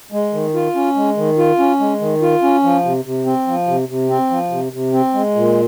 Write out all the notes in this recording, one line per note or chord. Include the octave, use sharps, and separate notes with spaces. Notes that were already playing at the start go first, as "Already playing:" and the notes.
G#3
D#3
F4
C#4
G#3
D#3
F4
C#4
G#3
D#3
F4
C#4
F3
C3
C3
C4
F3
C3
C3
C4
F3
C3
C3
C4
G#3
A#2